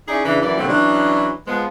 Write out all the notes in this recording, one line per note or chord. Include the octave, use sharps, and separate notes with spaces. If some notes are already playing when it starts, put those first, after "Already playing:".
C#4 D#4 E4 G#4 D5
C#3 E3 D4
F#2 E3 D5
B2 D3 F#3 G3 A#3 C4
E3 F#3 C#4 D4
F3 G#3 B3